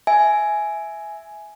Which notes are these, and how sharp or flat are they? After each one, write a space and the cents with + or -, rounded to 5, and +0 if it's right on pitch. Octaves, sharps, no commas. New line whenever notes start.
E5 +0 G#5 +10